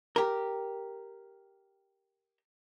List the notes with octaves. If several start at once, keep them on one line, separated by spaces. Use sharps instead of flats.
G4 A#4